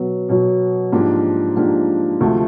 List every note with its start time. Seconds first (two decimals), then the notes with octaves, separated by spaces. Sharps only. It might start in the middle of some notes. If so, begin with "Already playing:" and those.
Already playing: B2 F#3 B3
0.29 B2 F#3 B3
0.92 G#2 F3 A#3 D4 G4
1.56 G#2 F3 A#3 D4 G4
2.20 D2 C3 F3 A3